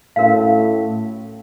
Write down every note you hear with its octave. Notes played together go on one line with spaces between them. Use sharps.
A2 C#4 F#4 A#4 C#5 F5